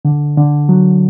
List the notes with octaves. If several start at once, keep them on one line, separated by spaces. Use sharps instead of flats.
D3
D3
F#3